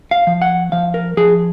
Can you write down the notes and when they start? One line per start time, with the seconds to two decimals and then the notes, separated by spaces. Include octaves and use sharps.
0.11 F5
0.27 F3
0.42 F#5
0.72 F3 F5
0.94 A#4
1.17 F3 G#4